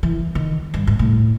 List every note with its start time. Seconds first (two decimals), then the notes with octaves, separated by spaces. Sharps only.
0.03 E3
0.35 D#3
0.74 G2
0.87 G#2
0.99 A2